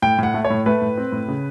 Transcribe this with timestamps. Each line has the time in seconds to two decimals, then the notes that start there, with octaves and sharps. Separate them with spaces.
0.02 A2 G5
0.19 A2 F#5
0.34 A3
0.45 C#5
0.50 A2
0.66 A3 B4
0.82 A2
0.98 C4
1.12 A2
1.28 C#3